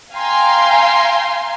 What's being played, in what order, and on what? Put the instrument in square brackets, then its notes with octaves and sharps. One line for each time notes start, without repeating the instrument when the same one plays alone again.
[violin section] F5 G5 G#5 A#5 C6